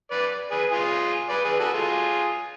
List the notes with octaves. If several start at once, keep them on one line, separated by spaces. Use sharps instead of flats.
B4 D5
G#4 B4
F4 G#4
B4 D5
G#4 B4
F#4 A4
F4 G#4